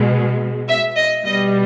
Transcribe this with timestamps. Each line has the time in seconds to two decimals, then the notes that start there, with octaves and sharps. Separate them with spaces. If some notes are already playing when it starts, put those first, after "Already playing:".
Already playing: B2 G#3
0.69 E5
0.97 D#5
1.26 B2 G3 D#5